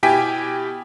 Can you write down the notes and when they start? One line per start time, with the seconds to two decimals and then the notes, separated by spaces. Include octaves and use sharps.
0.03 B2 E4 G4 G5 G#5 B6